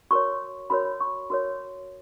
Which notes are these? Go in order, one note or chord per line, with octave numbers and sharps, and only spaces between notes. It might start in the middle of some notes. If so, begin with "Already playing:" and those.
F#4 A#4 C#5 C#6
F#4 A#4 C#5 B5
C#6
F#4 A#4 C#5